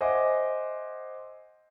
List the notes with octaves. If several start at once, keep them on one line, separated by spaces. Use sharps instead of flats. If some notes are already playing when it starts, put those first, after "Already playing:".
C5 D#5 E5 F#5 G#5 D6